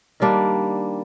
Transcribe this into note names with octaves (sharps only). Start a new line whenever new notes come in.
D#3 G3 A#3 D4